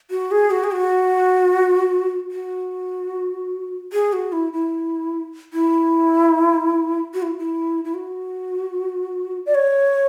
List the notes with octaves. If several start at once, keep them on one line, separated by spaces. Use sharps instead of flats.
F#4
G#4
F#4
G#4
F#4
F#4
G#4
F#4
E4
E4
E4
F#4
E4
E4
E4
F#4
D5
C#5